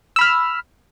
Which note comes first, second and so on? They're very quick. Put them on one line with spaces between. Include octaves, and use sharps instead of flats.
E6 B5 F6